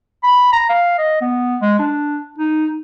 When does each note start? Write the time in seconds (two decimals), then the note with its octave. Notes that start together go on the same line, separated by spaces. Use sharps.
0.24 B5
0.53 A#5
0.70 F5
0.98 D#5
1.21 B3
1.61 G#3
1.79 D4
2.38 D#4